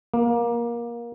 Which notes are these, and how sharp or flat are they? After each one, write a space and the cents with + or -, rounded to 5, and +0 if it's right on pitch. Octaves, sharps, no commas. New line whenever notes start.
A#3 +20